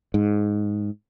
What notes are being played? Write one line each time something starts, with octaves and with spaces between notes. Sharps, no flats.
G#2